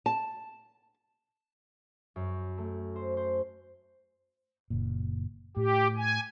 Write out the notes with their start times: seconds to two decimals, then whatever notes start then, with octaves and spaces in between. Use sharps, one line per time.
0.06 A5
2.16 F#2
2.58 A3
2.96 C5
3.17 C5
4.70 F#1 A#2
5.57 A2 G4
5.97 G#5